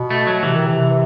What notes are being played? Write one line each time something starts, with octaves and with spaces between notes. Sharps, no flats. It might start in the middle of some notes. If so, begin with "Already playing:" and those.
Already playing: B2
A3
F#3
C3 E3
D#3
C3